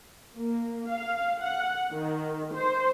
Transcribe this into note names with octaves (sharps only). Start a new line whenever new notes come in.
A#3
F5
F#5
D#3
C5